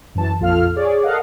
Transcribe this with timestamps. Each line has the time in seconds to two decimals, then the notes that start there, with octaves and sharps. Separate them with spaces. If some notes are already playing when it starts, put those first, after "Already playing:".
0.15 F#2 E3 A5
0.39 A#1 F2 F4 A4 F5 F6
0.76 G#4 C#5 D5
1.03 A4 A#4 D#5 F5 F#5